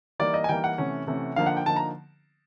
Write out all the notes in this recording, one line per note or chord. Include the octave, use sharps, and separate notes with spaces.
E3 G3 A#3 D#4 D5
D#5
G#5
E3 G3 A#3 D#4 G5
F#5
C3 E3 A3 C#4
C3 E3 A3 C#4
D3 F3 A#3 D#4 F5
F#5
G5
D3 F3 A#3 D#4 A5
A#5